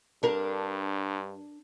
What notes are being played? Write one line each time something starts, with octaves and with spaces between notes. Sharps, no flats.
G2 D4 A#4